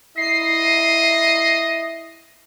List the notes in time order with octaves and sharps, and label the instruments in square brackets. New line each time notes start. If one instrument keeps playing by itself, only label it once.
[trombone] E4 [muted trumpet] D#5 [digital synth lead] C7